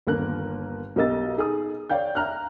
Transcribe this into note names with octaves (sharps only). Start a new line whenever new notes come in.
G1 D#2 A#3 A#4 F#6
B1 G4 A#4 D#5 E6 A6
D#4 G#4 D#6
C#5 D5 F5 G5 G6
E5 A#5 F6 F#6